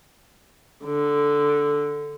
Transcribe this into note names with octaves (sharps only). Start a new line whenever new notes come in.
D3